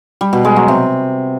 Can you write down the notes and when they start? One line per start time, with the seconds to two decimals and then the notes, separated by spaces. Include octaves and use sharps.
0.21 G3
0.33 B2
0.45 G#3
0.56 F#3
0.68 C3